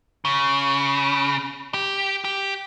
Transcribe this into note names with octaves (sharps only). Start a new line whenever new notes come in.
C#3
G4
G4